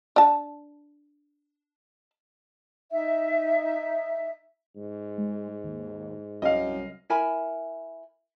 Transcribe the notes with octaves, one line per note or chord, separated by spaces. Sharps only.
D4 A5
D#4 E5
G#2
G#3
D#2
C2 F#2 D#5 F5
E4 A#4 G#5 B5